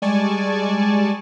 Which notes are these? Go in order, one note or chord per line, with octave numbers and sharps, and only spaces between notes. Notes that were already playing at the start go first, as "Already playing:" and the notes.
G3 G#3 D5 G#5 A5 C#6